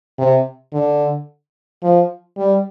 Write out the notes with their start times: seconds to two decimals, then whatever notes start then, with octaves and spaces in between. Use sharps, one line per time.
0.18 C3
0.73 D3
1.83 F3
2.38 G3